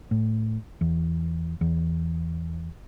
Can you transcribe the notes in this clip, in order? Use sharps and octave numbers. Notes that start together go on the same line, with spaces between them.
A2
E2
E2